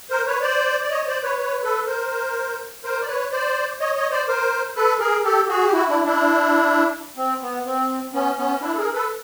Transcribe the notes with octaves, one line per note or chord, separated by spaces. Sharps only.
A#4 C5
B4 C#5
C5 D5
D5
C#5 D#5
C5 D5
B4 C#5
B4 C#5
A4 B4
A#4 C5
A#4 C5
D5
B4 C#5
C5 D5
C#5 D#5
C#5 D#5
C5 D5
A#4 C5
A4 B4
G#4 A#4
G4 A4
F#4 G#4
G4
E4 F#4
D4 E4
D4 E4
C4
B3
C4
B3 C#4
B3 C#4
D4 E4
A4
G#4 A#4
A4 B4